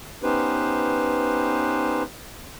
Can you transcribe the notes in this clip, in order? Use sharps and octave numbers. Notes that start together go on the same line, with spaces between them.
B3 C#4 D#4 G4 B4 C5